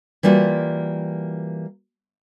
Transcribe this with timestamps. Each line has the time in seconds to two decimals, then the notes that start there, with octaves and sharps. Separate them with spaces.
0.23 E3 G3 A#3 F4 F#4